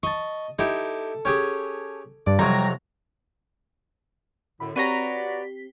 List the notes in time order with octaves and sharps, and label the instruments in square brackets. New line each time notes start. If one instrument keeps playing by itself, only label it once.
[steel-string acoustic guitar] D#5 [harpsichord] A5 C#6
[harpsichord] D#4 E4 G4 [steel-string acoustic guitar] A4
[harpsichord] C#4 G4 G#4
[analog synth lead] G2 [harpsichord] D5
[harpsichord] F2 C3 F#3 [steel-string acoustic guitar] G3 C#5 [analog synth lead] A#5
[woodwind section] F#2 A2 D3 [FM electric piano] B5
[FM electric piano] C4 G4 B6 [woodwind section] F#4 D5 [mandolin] B4 C#5 A#5